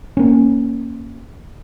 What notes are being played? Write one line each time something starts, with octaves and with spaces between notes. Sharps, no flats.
A#3 C#4